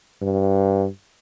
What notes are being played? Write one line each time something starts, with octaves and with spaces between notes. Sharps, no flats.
G2